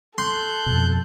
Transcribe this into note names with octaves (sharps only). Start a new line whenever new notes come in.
A4 C6 F#6 G6
F2 B2